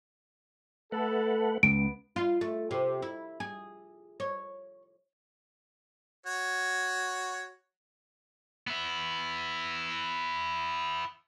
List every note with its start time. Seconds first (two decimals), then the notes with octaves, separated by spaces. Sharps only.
0.92 A3 A4 B4 F#5
1.63 C#2 B3 D7
2.16 F4
2.41 A3
2.71 C3
3.02 E4
3.40 G#4
4.20 C#5
6.26 F#4 C#5
8.67 B3 E4